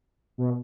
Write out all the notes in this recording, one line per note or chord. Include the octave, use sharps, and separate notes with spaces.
B2